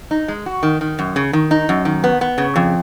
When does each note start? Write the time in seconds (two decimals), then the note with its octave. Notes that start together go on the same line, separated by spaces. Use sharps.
0.11 D#4
0.28 G#3
0.46 F#4
0.63 D#3
0.81 D#3
0.99 F#2
1.16 C#3
1.33 D#3
1.51 D#4
1.69 F#2
1.85 D#3
2.04 B3
2.21 B3
2.38 C#3
2.56 F2